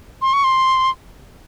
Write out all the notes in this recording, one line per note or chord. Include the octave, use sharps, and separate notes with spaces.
C6
C#6
C6